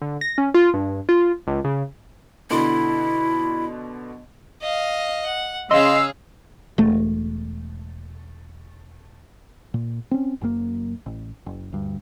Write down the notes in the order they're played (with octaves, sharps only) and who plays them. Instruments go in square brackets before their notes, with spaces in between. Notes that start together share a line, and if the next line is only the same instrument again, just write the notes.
[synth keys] D3
A#6
C#4
F4
G2
F4
C#2
C#3
[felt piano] B2 D3 C6 [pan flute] E4
[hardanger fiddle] D#5 F5
F#5
[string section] C#3 F5 [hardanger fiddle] G#4 [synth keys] D#5 C6 [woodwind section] E6
[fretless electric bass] E1 A3
[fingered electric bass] A#2
C4 C#4
F#1 F#2 C#3 A#3
A1
F#1
D2 G2